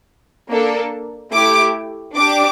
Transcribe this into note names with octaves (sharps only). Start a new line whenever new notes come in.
A#3 D4 A4
A3 E4 G4 D6
D4 G4 D6